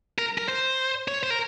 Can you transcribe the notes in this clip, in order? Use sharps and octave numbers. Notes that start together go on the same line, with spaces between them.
A#4
A#4
C5
C#5
C5
A#4